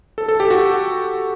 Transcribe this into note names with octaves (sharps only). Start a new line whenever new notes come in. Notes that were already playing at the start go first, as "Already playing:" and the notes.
A4
A4
G4
F#4